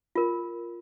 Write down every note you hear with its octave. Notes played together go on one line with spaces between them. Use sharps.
F4 A#4